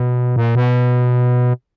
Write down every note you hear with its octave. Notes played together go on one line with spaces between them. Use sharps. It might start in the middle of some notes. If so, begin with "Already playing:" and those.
Already playing: B2
A#2
B2